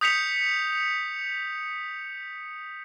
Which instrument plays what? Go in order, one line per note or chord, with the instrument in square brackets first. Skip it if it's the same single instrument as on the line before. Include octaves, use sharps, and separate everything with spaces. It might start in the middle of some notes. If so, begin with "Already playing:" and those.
[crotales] D#6 G6 B6 C#7 F7